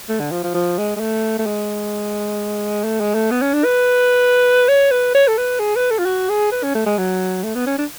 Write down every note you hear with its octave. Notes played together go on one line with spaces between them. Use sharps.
A3
D3
F3
F3
F3
G#3
G#3
A3
A3
G#3
A3
G#3
A3
B3
C#4
D4
B4
C#5
B4
C#5
A4
B4
G#4
B4
A4
F4
F#4
G#4
B4
C#4
A3
G#3
F#3
A3
B3
C#4
D4